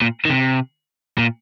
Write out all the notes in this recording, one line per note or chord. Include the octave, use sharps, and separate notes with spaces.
A#2
D#3
C3
A#2